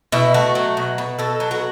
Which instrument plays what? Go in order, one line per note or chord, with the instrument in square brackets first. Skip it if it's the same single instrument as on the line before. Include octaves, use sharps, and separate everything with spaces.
[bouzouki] B2 E4
A3 F#4
F#3
B2
B2
B2 A4
F#3
F#4